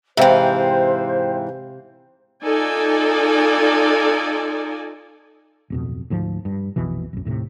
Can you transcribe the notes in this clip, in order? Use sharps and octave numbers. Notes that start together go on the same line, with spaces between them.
G#2 C3 E3 C5 E5 F5 G5
D#4 F4 A4 D5 G#5
D1 F2 B2
D2 G#2 F3
G2
A#1 F2 B2 E3
B1 F#2
D#2 A2 C3